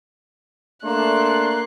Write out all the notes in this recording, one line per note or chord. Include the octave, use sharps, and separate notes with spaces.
A3 A#3 D4 C6 F#6